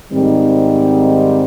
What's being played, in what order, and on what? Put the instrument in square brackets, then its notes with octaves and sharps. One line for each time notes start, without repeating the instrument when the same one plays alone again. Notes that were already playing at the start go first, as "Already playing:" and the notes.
[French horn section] G#2 D#3 G3 C4